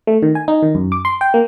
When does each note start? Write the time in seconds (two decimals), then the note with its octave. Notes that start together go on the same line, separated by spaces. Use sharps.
0.07 A3
0.23 D#3
0.35 G#5
0.48 D#4
0.62 D#3
0.75 F#2
0.92 D6
1.05 C6
1.21 G5
1.34 A#3